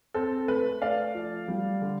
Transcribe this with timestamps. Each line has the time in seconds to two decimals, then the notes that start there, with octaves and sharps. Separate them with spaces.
0.14 C4 A4
0.48 A3 B4
0.82 A3 D5 F5
1.15 F3
1.48 G3
1.81 D3